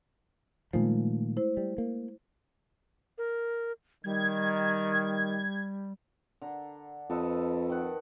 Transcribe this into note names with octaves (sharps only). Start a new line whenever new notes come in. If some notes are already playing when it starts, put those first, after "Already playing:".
A#2 D#3 F3 G#3 A3
E4 C5
G3
A#3
A#4
D#3 G3 G#6
D3 A#5
F2 A4 B4 D#5
D#3 F#5